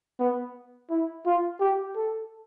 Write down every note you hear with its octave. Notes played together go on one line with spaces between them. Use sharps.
B3
E4
F4
G4
A4